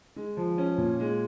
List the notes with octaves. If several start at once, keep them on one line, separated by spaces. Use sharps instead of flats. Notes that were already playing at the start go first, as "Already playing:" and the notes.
G#3
F3
C#4
A#2
G#3